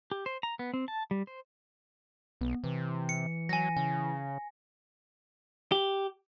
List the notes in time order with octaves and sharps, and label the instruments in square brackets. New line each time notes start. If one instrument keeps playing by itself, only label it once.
[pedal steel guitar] G4
C5
A#5
B3
C4
A5
G3
C5
[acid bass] B1 [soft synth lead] B3
[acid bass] C3 [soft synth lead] E3
[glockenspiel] C#7
[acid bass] F#3 [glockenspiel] G#5 A#6
[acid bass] C#3 [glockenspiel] G#5
[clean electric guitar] G4